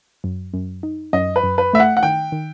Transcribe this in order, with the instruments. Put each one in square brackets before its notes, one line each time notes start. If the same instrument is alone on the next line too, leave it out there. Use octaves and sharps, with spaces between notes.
[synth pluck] F#2
F#2
D#4
[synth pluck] F#2 [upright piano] D#5
[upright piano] B4
[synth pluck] F#2
[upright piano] B4
[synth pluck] A3 [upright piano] E5
[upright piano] F#5
F#5
[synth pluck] D#3 [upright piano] G5
[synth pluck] D#3